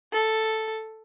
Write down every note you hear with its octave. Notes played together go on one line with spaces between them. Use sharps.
A4